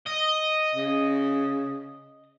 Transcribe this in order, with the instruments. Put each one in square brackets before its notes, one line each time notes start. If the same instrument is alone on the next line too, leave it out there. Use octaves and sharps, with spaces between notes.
[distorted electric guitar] D#5
[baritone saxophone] C#3